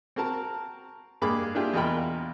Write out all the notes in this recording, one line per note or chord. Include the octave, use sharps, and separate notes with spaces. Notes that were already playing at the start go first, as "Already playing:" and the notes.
C4 F#4 A#4 A5 A#5
G2 G#3 A#3 G#4 B5 D6
A#3 D4 E4 F4 G4 G#4
E2 B2 F4 A#4 G5 B5